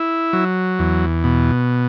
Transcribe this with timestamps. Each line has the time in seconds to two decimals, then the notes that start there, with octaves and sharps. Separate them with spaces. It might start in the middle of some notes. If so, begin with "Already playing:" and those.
Already playing: E4
0.33 F#3
0.79 E2
1.24 B2